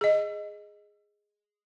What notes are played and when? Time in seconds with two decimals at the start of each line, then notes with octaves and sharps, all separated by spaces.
0.01 G#4 D#5